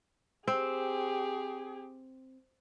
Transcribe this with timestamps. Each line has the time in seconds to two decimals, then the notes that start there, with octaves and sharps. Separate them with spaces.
0.47 C4 G4 G#4